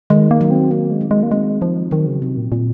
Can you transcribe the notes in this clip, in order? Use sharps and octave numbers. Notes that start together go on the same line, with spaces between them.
D#3 G#3
A#3
F#3
C4
A#3 C4
G#3
D#4
G#3
A#3
G#3 C4
F3 D#4
D#3 F#3
C#3
C3 C4
A#2
A#2 C4